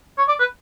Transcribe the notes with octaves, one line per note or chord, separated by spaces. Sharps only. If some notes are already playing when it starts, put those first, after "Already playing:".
C#5
D5
B4